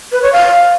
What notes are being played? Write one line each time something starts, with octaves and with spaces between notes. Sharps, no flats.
B4
C#5
F5